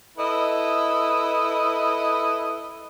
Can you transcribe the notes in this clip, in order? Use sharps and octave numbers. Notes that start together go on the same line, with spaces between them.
E4 A4 B4 D#5